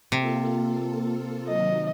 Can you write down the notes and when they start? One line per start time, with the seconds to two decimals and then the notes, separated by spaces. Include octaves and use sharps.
0.12 C3 A#3 F4 A4
1.48 D#3 F#3 D#5